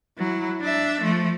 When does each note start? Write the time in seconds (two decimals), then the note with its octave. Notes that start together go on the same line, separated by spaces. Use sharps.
0.18 F#3 E4
0.61 D4 E5
1.01 F3 A3